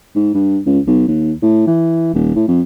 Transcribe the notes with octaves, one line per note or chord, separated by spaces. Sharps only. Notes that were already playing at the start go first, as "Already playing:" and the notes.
G#2
G2
C#2
B1
D#2
A2
E3
D#1
A2
F2